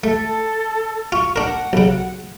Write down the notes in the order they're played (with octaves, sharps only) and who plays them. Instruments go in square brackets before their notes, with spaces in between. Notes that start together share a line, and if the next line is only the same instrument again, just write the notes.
[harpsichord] A3 [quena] A4
[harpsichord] F4 [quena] C#6
[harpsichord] D4 A#4 [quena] F#5
[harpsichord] B1 C#3